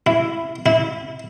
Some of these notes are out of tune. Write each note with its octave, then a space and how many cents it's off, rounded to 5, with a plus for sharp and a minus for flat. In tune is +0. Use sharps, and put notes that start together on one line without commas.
E4 +5
E4 -25